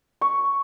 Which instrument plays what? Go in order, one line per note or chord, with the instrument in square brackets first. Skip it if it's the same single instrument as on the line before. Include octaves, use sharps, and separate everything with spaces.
[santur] C#6